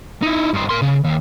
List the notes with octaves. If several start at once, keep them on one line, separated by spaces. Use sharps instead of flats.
D#4 E4
G2 C5
A#4 C6
C#3
D#2